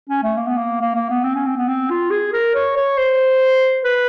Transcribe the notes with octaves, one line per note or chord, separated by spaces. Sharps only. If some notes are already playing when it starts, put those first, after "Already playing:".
C#4
A3
A#3
B3
A#3
A#3
A#3
B3
C4
C#4
C4
B3
C4
F4
G#4
A#4
C#5
C#5
C5
B4